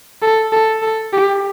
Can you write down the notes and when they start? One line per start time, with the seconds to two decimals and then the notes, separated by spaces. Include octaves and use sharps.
0.22 A4
0.52 A4
0.82 A4
1.13 G4